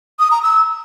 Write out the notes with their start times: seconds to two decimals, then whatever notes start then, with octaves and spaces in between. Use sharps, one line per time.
0.19 D#6
0.31 A#5
0.43 E6